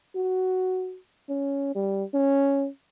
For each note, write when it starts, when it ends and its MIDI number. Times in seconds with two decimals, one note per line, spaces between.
0.16 0.98 66
1.29 1.72 61
1.75 2.04 55
2.14 2.68 61